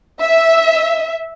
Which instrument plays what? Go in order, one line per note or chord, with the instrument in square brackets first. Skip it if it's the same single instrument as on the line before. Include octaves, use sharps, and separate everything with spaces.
[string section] E5